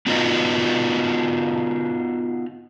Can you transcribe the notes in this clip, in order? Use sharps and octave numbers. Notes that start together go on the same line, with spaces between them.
B3 D#4 F4 F#4 B4 D#5